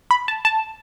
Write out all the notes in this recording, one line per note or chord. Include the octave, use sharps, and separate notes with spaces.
B5
A5
A5